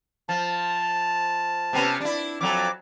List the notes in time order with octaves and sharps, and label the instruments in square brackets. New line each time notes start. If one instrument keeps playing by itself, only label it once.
[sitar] F3 [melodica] A5
[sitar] C3 B3 C#4
D4 E4
[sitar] F2 F#3 A4 [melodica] D6